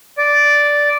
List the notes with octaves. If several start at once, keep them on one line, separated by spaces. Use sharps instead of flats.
D5